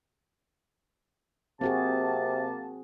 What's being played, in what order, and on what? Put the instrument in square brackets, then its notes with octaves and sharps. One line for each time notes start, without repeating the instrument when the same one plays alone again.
[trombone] C3 [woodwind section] A#3 A5 [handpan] C4 F#4 G#4